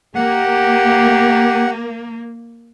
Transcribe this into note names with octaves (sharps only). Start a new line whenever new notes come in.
A#3 G4 F#5